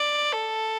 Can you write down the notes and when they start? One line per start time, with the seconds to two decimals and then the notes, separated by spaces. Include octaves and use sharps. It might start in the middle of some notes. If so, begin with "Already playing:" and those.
Already playing: D5
0.33 A4